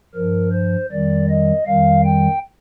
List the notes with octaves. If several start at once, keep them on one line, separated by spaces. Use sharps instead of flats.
G2 F3 A#4
C5
F2 D#3 G3 D5
D#5
F2 D#3 G3 F5
G5